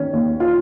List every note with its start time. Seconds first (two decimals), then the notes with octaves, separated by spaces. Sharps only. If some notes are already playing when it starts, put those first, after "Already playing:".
Already playing: D#3 C#4
0.13 D#2
0.40 F4